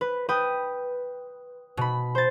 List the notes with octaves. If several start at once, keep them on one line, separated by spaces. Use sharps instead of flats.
B4
B4 G5 D#6
B2 B5
C5 A6